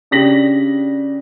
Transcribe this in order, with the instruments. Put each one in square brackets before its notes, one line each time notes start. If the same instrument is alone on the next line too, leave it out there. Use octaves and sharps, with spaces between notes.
[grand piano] C#3 D4 G4 A#6 B6 F#7